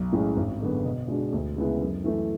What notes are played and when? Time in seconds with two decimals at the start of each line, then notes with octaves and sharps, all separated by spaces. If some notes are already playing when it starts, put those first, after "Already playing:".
Already playing: B1
0.12 A2 G#3 C#4
0.37 G#1
0.60 F#2 D3 G#3 B3
0.84 B2
1.08 G#3 D4 F#4
1.33 D2
1.56 C#3 G#3 B3 E4
1.81 F#2
2.04 E3 A3